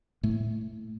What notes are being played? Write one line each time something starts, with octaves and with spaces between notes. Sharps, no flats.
A2 A3